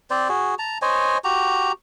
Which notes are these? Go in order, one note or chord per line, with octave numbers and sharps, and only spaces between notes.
C4 C5 D5
F#4 G#4
A5 A#5
C5 C#5 D#5 G#5
F#4 G4 A#5